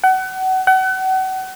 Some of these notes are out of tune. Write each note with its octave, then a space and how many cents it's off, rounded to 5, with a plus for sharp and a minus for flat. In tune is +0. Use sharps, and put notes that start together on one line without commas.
F#5 +30
F#5 +35